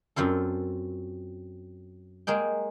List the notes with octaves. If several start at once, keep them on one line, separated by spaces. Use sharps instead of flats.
F#2 C4 F4 A4
G#3 A#3 G#4 G5